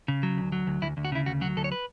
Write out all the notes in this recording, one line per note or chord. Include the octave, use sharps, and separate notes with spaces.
C#3
F#3
D2
F#3
D2
D2 E4
D2
F#4
C#3 E4
D2 F#4
F#3 F#4
D2 A4
C#5
B4